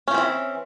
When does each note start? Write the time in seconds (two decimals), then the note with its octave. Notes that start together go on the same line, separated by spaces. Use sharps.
0.08 C#4
0.11 F3
0.14 C4
0.18 E3